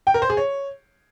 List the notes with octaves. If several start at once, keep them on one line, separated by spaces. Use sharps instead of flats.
G5
A#4
C5
G#4
C#5